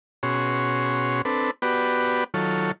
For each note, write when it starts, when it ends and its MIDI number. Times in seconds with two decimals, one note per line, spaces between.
0.23 1.22 47
0.23 1.22 61
0.23 1.22 66
0.23 1.22 68
0.23 1.22 73
0.23 1.22 84
1.25 1.51 60
1.25 1.51 62
1.25 1.51 69
1.25 1.51 71
1.62 2.24 59
1.62 2.24 66
1.62 2.24 67
1.62 2.24 71
1.62 2.24 74
2.34 2.71 51
2.34 2.71 54
2.34 2.71 65
2.34 2.71 69
2.34 2.71 73